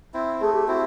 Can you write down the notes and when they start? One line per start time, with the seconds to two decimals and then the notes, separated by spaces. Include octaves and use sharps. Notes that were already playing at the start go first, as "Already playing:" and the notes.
0.14 C4 E4
0.41 A3 G#4
0.53 G4
0.66 C4 E4 F#4